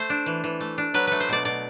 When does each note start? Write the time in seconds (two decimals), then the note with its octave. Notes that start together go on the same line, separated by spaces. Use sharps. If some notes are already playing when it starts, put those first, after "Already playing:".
Already playing: A3 C5
0.10 D4
0.26 E3
0.44 E3
0.61 A3
0.78 D4
0.94 F#3 B4
1.07 A3 B4
1.20 C5
1.29 B2 D5
1.45 B2 D5